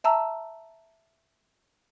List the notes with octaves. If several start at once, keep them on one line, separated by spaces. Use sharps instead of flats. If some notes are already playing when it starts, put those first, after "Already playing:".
E5 A5 A#5 E6